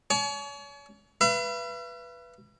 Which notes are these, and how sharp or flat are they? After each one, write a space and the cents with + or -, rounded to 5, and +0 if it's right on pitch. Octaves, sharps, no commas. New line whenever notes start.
C#5 +35 G#5 +45
B4 -5 E5 +45